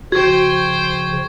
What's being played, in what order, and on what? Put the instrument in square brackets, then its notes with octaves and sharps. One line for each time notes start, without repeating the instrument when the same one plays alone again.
[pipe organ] C#3 F3 [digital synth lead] F#4 [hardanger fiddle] C5 G5 [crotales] C#6 G#6